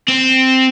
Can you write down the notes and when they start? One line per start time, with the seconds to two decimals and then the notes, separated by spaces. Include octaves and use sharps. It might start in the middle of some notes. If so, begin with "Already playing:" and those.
0.08 C4